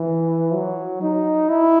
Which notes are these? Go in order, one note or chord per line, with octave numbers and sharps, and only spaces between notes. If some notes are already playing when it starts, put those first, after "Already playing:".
Already playing: E3
F#3
D#4
E4